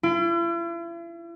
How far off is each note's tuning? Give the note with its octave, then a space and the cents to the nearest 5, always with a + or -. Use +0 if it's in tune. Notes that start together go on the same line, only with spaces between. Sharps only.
E4 +45